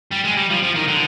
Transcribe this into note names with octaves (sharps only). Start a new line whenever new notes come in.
G3
G#3
G3
F3
F3
D#3
D3